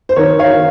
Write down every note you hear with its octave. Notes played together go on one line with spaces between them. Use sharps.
C5
D#3 A#4 C#5
C#5 F5
D#3